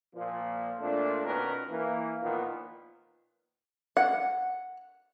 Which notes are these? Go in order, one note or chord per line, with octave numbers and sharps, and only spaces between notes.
A#2 F3
A#2 A3 C4 D4
B2 D#3 C#4 A#4 B4
E3 A#3
A#2 D#3 F3 B3
F#5